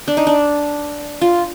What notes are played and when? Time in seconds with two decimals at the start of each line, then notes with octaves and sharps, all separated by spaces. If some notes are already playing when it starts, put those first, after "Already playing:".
0.08 D4
0.17 D#4
0.27 D4
1.21 F4